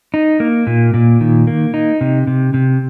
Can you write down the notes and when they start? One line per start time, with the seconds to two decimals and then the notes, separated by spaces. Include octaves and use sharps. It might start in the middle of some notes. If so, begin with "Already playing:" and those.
0.14 D#4
0.40 A#3
0.67 A#2
0.94 A#2
1.21 D#3
1.47 A#3
1.74 D#4
2.01 C3
2.27 C3
2.54 C3